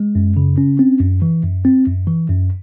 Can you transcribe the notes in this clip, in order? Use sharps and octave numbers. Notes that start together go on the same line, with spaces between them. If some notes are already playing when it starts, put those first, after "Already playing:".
Already playing: G#3
F#2
C#3
C#4
C4
F#2
E3
F#2
C4
F#2
E3
F#2